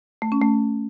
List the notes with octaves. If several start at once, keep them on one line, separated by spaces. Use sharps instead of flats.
A3
C#4
A3